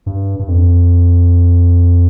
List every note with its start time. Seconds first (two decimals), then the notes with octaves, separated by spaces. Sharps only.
0.06 G2
0.39 G2
0.48 F2